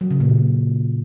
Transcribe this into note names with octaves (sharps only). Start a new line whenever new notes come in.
F#3
C#3
A#2